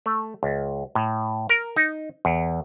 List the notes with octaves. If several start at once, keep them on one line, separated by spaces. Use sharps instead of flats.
A3
C#2
A2
A#4
D#4
E2